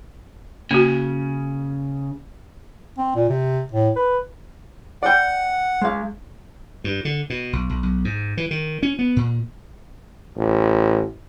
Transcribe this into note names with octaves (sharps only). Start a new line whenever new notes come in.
C#3 A#3 F#4
C4
A#2
C3
A2
B4
D5 F#5 G5
G#3 F5
G2
D3
B2
B1
B1
B1
G#2
E3
D#3
C#4
B3
A#2
A1